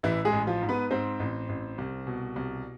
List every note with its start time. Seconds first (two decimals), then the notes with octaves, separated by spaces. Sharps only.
0.03 A1 E3 E4
0.25 G#3 G#4
0.32 A1
0.47 F3 F4
0.62 G#2
0.69 B3 B4
0.91 G#2 C4 C5
1.20 A1
1.49 A1
1.78 C2
2.07 B2
2.36 C2